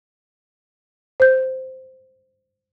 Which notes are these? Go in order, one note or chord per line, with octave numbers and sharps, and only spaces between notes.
C5 G6